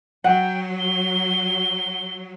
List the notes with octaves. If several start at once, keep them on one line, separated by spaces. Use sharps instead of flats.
F#3 F#5 G5
G7